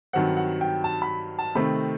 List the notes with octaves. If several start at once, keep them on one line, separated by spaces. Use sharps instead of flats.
G2 D#3 F#3 C4 F#5
F#5
G5
A5
B5
A5
C3 D#3 A3 C4 B5